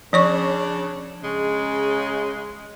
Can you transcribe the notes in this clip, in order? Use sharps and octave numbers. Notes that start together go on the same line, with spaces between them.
C#3 F3 C#4 D4 C#5 C#6
C#3 G#3